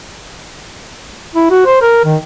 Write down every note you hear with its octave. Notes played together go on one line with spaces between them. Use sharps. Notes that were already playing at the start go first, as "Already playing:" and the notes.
E4
F#4
C5
A#4
D#3